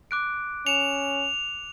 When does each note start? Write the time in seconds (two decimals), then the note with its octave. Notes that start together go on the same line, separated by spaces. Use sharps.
0.11 D6 F#6 D7
0.67 C#4 C#7 E7 F7